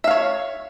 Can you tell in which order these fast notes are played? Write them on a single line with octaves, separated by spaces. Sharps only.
E5 F5 C#5